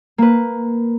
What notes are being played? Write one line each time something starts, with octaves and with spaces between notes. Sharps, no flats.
A#3 B4